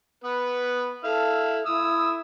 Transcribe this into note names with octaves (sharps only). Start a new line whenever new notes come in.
B3 B4
E4 A4 F5
E4 D#6 E6